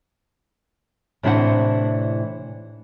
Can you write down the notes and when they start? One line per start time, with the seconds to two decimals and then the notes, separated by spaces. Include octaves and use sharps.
1.23 A2 C3 E3 D4 C5 F#5